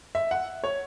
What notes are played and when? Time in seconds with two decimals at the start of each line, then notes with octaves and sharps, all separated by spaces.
0.15 E5
0.31 F#5
0.64 C#5